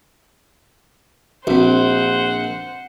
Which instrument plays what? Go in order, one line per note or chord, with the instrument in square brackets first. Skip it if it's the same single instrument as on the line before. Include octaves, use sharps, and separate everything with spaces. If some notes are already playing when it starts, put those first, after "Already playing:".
[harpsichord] A#1 [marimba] C4 F#4 [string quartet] C5 F#5